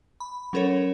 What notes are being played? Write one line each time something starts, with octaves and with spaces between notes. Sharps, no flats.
B5
F#3 C#4 A4 A#4 C#5